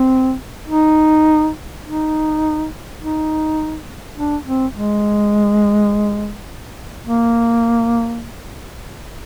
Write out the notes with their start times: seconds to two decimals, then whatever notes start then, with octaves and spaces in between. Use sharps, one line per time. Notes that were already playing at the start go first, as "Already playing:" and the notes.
Already playing: C4
0.68 D#4
1.84 D#4
3.00 D#4
4.16 D4
4.46 C4
4.75 G#3
7.07 A#3